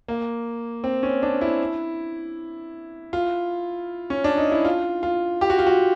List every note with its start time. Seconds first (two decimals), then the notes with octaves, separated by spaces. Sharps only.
0.08 A#3
0.84 C4
1.03 C#4
1.22 D4
1.41 E4
3.13 F4
4.10 C#4
4.24 D4
4.38 D#4
4.51 E4
4.65 F4
5.03 F4
5.41 G4
5.50 F#4
5.59 F4
5.67 F#4